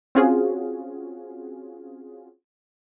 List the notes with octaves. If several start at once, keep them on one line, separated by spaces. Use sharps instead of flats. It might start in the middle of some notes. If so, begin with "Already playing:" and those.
C4 C#4 F4 F#4 G#4